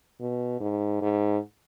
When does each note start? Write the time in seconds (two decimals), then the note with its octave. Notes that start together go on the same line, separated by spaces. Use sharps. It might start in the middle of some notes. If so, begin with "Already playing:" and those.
0.21 B2
0.60 G#2
1.02 G#2